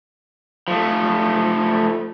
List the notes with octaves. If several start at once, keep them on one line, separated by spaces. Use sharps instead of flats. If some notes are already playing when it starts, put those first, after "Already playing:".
F3 A3